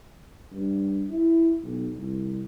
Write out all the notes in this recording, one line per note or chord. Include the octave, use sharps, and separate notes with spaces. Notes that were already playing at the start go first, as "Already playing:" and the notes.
G2
E4
B1
C2